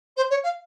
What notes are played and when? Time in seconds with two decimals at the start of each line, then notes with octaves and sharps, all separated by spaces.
0.16 C5
0.30 C#5
0.43 F5